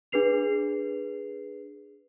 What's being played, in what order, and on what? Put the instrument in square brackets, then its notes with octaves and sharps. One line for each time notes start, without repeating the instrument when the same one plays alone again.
[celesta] D4 G#4 B4 C7 F7